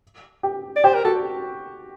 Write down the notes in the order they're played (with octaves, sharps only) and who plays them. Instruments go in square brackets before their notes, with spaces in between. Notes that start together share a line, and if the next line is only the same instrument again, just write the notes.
[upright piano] G4
[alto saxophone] D5
[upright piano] G4 [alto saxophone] C5
[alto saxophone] A#4
[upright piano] F#4 [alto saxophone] A4